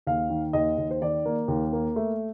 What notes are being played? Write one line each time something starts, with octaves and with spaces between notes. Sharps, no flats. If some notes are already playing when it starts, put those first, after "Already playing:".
D#2 F5
D#3
D#2 D#5
D#2
C5
D#3 D5
A#3
D#2
A#3
A3